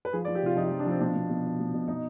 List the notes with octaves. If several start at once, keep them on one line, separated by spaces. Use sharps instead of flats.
B4
F3 G#4
D5
F3
G4
C3 F4
F3 D#4
F4
D#4
F3
D4
F3 C4
B2 D4
B2
B2
B2
B2
B2
B2 D#4